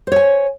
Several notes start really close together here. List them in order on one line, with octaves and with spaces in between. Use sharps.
C5 C#5 G#5